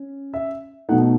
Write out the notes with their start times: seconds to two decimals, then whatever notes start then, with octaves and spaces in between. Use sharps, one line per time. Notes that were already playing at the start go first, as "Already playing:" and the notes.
Already playing: C#4
0.34 E5
0.89 B2 A3 D#4 F#5